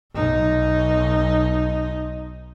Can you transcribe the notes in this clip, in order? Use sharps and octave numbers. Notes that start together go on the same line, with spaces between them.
B1 D#4